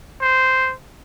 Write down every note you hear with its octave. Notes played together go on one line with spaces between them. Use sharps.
C5